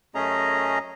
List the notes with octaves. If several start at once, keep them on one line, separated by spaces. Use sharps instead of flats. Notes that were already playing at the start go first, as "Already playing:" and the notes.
F#2 A3 C#4 G#4 D#5 A#5